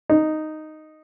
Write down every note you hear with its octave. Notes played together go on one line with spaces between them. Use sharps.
D#4